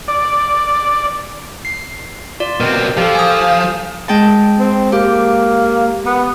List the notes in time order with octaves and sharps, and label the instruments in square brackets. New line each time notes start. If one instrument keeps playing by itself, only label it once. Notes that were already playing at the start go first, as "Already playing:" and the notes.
[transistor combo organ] D5
[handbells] C7
F4 D5
[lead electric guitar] B2 C4 [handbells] A#4
[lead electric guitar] F3 [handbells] G4 A4
[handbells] G#5 D#6
[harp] G#3 G5 A5
[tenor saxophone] C4
[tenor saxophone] A#3 [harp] G4
[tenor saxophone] B3